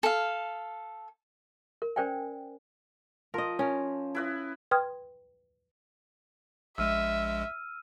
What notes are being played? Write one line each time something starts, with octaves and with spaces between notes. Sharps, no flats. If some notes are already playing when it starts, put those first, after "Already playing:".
A4 F5
A#4
C#4 A#4 C5 D5 G5 G#5
F3 A#4 D#5
C#4 A#4
E4 B4 D#5
B4 G5 C6 D#6 F6 G#6
A#1 G#3 E5 E6 F6 D#7